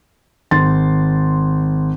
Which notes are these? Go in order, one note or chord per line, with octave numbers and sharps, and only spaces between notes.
G#1 C6 A6